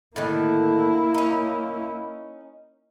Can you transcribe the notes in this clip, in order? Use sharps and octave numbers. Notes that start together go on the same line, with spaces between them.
A2 D3 D#3 A#3 E4
C#4 D#4